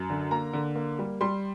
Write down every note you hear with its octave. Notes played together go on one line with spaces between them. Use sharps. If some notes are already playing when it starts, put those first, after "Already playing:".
Already playing: F#2
D3
A#3 A#5
D3
A#3
G3
G3 C6